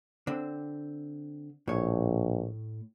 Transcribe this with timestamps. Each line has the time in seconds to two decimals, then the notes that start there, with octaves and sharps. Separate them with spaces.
0.27 D3 C4
1.68 A#1 A2 C#5